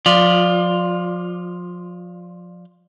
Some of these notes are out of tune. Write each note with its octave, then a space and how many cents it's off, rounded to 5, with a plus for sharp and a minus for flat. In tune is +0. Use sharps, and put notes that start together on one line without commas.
F3 +30 F4 +0 D5 +10